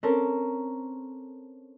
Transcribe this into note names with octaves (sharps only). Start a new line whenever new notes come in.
C4 C#4 A4 A#4